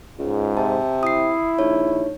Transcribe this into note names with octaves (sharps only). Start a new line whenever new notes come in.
C#2 G#2
C3 A5
E4 D#6 C7
A#1 D#4 C#5